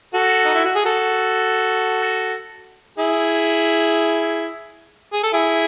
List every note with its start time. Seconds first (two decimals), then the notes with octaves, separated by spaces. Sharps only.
0.14 F#4 A4
0.45 D#4
0.55 E4
0.65 F#4
0.75 G#4
0.85 F#4 A4
2.98 E4 G#4
5.13 G#4
5.23 A4
5.33 E4 G#4